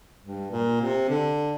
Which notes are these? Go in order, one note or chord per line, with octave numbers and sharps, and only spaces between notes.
G2
A#2
C3
D3